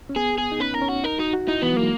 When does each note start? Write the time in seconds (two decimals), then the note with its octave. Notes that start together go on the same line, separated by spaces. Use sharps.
0.09 C#4
0.16 B3 G#4
0.38 G#4
0.52 D#4
0.60 C#4 B4
0.75 A#4
0.81 C#4
0.89 F#4
1.04 D#4 A#4
1.18 D#4 F#4
1.33 F#4
1.48 D#4 E4
1.62 E3 B3
1.73 F#3 A#3
1.82 G#3